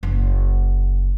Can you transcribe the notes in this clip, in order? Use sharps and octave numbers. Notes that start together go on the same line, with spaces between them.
F#1